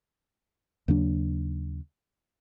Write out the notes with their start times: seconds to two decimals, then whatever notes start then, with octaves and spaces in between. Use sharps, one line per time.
0.88 D#2 C#3 F#3 D4